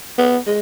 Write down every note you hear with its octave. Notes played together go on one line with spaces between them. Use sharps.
B3
G#3